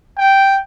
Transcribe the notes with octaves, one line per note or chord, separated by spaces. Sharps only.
G5